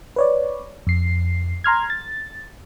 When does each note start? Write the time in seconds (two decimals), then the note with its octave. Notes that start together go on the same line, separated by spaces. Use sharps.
0.16 B4 C#5 D5
0.87 F2 C7
1.64 A#5 C6 F6 G#6
1.90 A6